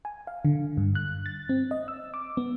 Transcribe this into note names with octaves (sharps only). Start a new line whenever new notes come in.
G#5
F5
D3
G2
F#6
A6
C4
D#5
E6
D6
B3